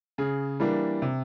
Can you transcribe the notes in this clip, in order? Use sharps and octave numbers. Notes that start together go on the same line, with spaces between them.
C#3 G#4
E3 G3 A#3 D4
C3